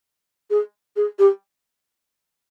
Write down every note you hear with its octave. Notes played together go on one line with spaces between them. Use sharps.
G#4
G#4
G4